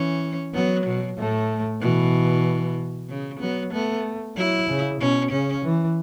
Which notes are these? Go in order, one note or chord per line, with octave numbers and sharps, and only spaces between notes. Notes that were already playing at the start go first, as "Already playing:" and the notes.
Already playing: E3 C#4
F#3 B3
B2
A2 A3
B2 E3
C#3
F#3 B3
A3 B3
F#3 E4
C#3
B2 C#4
C#3 C#4
E3